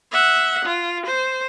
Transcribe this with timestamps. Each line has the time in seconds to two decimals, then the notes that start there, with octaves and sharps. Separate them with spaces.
0.12 E5 F#5
0.65 F4
1.06 C5